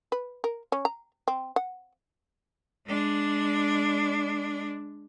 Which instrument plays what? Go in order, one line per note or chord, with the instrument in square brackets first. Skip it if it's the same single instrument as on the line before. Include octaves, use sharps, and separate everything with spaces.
[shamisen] B4
A#4
C#4
A#5
C4
F#5
[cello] G#3 D4